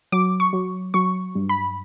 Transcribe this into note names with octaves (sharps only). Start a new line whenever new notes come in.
F#3 D6
C#6
F#3
F#3 C#6
G2
B5